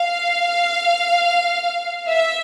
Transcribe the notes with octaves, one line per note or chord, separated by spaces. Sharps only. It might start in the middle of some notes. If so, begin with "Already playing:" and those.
Already playing: F5
E5